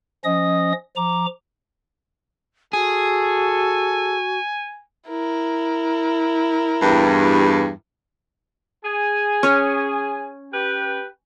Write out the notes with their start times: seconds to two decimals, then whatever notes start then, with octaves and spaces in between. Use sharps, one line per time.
0.24 F3 C#4 D#5 D#6
0.96 F3 A#5 D6
2.73 F#4 G#4 A4 G#5
5.09 E4 A#4
6.82 E2 G2
8.84 G#4 G#5
9.43 C#4 C#5
10.53 G4 B4 G5